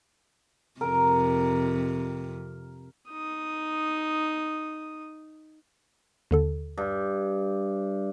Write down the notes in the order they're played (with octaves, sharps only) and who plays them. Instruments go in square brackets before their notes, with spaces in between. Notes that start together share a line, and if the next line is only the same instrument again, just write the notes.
[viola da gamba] F2 C3 [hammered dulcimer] A#4
[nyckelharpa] D#4 D#6
[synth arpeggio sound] D#2 D3 A4
[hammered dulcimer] G2